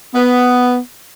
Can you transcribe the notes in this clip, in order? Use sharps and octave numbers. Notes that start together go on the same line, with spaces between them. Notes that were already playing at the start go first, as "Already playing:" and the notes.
B3